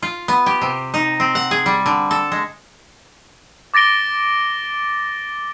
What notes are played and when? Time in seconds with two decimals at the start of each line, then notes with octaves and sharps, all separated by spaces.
0.02 F4
0.28 B3
0.46 G4
0.62 C3
0.94 D#4
1.20 C4
1.35 F#5
1.51 G#4
1.66 G3
1.86 D3
2.11 A4
2.32 G#3
3.74 D6 A6 A#6 D7 G7